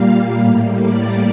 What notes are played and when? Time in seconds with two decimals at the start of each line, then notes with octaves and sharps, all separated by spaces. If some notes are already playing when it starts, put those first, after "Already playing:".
Already playing: A#2 G3 A#3 F5
0.39 A2 G3 A#3
0.78 D5